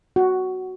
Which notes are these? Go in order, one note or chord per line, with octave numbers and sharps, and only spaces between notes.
F#4